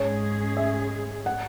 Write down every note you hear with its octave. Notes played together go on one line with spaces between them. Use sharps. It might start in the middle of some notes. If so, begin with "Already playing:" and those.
Already playing: G#2 G#3 C#4 G#4 C#5
E5
F#5